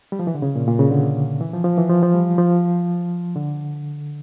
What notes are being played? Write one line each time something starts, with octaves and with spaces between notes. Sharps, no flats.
G3
F3
E3
D3
C#3
A#2
A#2
C#3
D3
E3
F3
F3
E3
F3
F3
G3
F3
D3